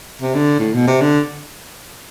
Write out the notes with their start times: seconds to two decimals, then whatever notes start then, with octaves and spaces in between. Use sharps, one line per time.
0.22 C3
0.34 D3
0.59 A2
0.74 B2
0.87 C3
1.01 D3